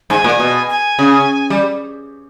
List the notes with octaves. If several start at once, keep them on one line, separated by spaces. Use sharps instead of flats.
G#2 G#5
A#2
B2
G#5
C#3
G3